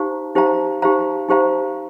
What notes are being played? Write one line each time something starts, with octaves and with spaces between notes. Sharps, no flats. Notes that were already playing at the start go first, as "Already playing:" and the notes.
Already playing: D#4 G4 C5 F5 A#5
D#4 G4 C5 F5 A#5
D#4 G4 C5 F5 A#5
D#4 G4 C5 F5 A#5